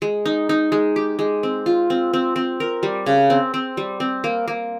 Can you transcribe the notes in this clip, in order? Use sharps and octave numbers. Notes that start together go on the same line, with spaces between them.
G#3
D#4
D#4
G#3
G4
G#3
C4
F4
C4
C4
C4
A#4
G3
C#3
C4
C4
G3
C4
A#3
A#3